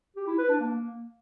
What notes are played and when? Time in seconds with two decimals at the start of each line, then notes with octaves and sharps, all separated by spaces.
0.16 G4
0.27 E4
0.38 B4
0.49 D4
0.60 A#3